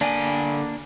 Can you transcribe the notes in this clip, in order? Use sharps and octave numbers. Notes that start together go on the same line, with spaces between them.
D3 A#3 D4 G#5